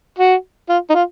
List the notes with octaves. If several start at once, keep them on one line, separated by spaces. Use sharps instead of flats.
F#4
F4
D#4
F4